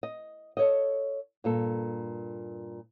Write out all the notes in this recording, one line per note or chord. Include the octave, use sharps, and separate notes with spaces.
D#5
A4 C#5 D#5
G2 A#2 A4